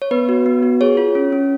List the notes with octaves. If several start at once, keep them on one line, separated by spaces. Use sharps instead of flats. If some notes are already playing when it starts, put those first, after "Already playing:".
C#5
B3 B4
F#4
B3
F#4
G#4 C#5
F4
C#4
C#4